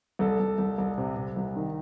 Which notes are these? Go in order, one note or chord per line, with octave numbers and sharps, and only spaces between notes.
C2 A4
C2
C2
C2
C3
C3
C2
D#3